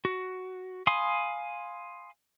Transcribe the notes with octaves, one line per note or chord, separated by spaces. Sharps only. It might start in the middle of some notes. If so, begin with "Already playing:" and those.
F#4
F5 G#5 B5 C6 D#6